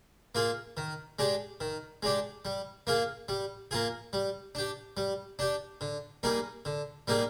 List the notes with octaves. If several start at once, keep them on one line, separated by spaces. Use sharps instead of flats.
A#3 F4 G#4
D#3
G#3 D4 G4
D#3
G#3 D4 G4
G3
A#3 F4 G#4
G3
A#3 F4 G#4
G3
D4 G4
G3
D4 G4
D3
G3 A#3 D#4 G#4
D3
G3 A#3 D#4 G#4